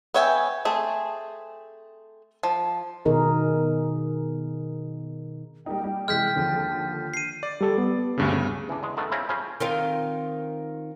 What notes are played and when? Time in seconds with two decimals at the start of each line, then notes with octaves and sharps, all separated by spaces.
0.14 B3 C#5 E5 G5 G#5
0.65 A3 C4 G#4
2.43 F3
3.05 B2 D#3 D#4 G#4 A#4
5.66 G3 A#3 D#4 G5
5.84 G3
6.08 C3 E3 G#3 F6 G6 B6
6.35 D#2 D3 F3
7.14 C7 D#7
7.43 D5
7.61 G3 A4
7.78 B3
8.18 D2 G2 C#3
8.32 C#3
8.69 E3 D4
8.83 E2 G#3
8.97 D3 D#3 A3 B3
9.12 C#3 C4 C#4 E4
9.29 C#3 F3 C#4 C5
9.60 D#3 C4 F4